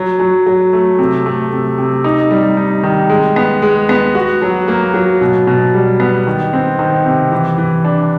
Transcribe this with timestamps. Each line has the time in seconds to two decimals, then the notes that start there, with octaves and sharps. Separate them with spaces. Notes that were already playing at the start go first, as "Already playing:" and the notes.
Already playing: F#3
0.19 F#3
0.46 F#3
0.73 A3
0.99 C3
1.26 A3
1.52 C3
1.78 C3
2.04 D#4
2.31 G3
2.57 D#4
2.83 D#3
3.09 G#3
3.36 B3
3.62 G#3
3.89 B3
4.15 F#4
4.42 F#3
4.68 A#3
4.94 F#3
5.21 B2
5.47 B2
5.74 G3
6.00 B3
6.27 D#3
6.53 C4
6.79 D#3
7.05 C3
7.32 E3
7.58 E3
7.84 D4